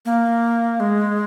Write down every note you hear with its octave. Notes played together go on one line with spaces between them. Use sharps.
A#3
G#3